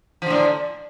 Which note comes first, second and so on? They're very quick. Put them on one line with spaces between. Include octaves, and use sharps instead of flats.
F3 D3 A2